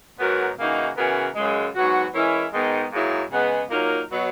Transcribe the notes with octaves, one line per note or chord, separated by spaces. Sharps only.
G#2 F#3 B3 F#4 A#4
C#3 E3 A#3 D#4 F#4
C#3 E3 B3 F#4 A#4
F#2 C#3 G#3
G#2 F#3 B3 F#4
E3 G#3 C#4 E4 A#4
G#2 D#3 G#3 B3 D#4
G#2 F#3 A#3 E4 G#4
C#3 G#3 B3
A#2 F#3 A#3 D#4 A#4
B2 F#3 B3